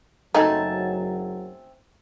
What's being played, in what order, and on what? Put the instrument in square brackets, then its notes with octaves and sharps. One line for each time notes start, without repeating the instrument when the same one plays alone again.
[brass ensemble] F#1 F#3 [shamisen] A3 D#4 [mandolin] C4 G#5 A5